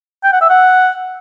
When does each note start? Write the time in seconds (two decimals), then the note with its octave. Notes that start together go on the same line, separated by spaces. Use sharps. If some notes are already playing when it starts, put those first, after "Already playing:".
0.24 G5
0.32 F#5
0.41 E5
0.50 F#5